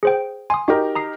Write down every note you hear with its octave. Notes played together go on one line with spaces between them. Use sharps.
G#4 C5 G5
G#5 C6 D#6
D#4 F#4 G4 A#4
A#5 D#6 C7